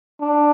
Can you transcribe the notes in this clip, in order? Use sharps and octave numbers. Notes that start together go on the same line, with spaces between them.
D4